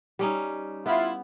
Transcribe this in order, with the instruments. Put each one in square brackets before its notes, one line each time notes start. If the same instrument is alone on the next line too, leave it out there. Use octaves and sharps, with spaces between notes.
[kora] G3 C#4 D#4
[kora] B3 [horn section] E4 F4